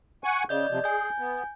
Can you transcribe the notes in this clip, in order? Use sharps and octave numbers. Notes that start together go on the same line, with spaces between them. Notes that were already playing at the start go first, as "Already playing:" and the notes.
F#5 G#5 C#6
C#3 D5 D#5 G6
C3 F3
G#4 G#5 G6
B3